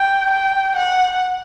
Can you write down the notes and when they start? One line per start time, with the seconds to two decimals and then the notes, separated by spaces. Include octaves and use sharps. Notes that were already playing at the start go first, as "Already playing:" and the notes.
Already playing: G5
0.31 G5
0.77 F#5